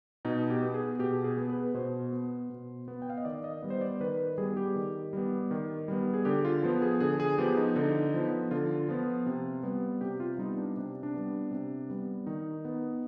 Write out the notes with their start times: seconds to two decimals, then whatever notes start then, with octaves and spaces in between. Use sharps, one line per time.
0.25 B2 D#4
0.50 G4
0.62 B3
0.74 G#4
0.99 B2 G4
1.24 G#4
1.38 B3
1.50 B4
1.75 B2 C5
2.13 B3
2.50 B2
2.88 B3
3.02 G5
3.10 F5
3.18 D#5
3.25 D#3 D5
3.44 D#5
3.62 G3 B3
3.70 C5
3.81 D5
4.00 D#3 B4
4.19 B4
4.38 G3 B3 G#4
4.57 G4
4.76 D#3
5.13 G3 B3
5.51 D#3
5.88 G3 B3
6.14 G#4
6.25 D3 G4
6.45 F4
6.63 F3 B3
6.82 G#4
7.00 D3 G#4
7.20 G#4
7.38 F3 B3 G4
7.57 D#4
7.76 D3 D#4
8.14 F3 B3
8.51 D3 F4
8.88 F3 B3
9.26 C3
9.63 G3 B3
10.01 C3 G4
10.20 F4
10.38 G3 B3 D#4
10.57 D4
10.76 C3 D4
11.03 D4
11.14 G3 B3
11.51 C3
11.90 G3 B3
12.27 D#3 D#4
12.65 B3